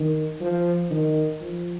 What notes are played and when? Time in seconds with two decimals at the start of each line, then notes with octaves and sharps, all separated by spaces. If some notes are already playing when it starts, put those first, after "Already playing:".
Already playing: D#3
0.41 F3
0.91 D#3
1.41 F3